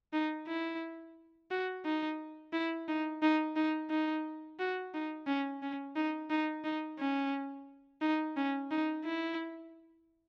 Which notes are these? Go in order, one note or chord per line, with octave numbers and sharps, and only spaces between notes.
D#4
E4
F#4
D#4
E4
D#4
D#4
D#4
D#4
F#4
D#4
C#4
C#4
D#4
D#4
D#4
C#4
D#4
C#4
D#4
E4